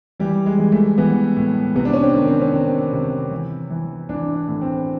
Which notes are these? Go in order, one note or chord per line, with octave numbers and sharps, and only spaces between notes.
E3 G3
G#3
E3
A3
E3 B3
A2
C3 B3
D4
C#4
C4
D#3
C4
C#4
D#3 C4
C3
E3
E3
E3 D4
D4
A2
C4